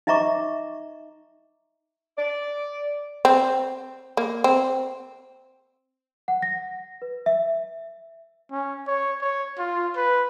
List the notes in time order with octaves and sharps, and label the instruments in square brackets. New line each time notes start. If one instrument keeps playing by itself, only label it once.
[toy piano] D#4 D#5 E5 A#5 C#6 D6
[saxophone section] D5
[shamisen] C4
A#3
C4
[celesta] F#5
A#6
B4
E5
[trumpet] C#4
C#5
C#5
F4
B4